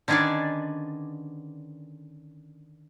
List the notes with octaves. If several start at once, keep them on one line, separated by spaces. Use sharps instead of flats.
D3 D#3 C#4 G#4 B4 D5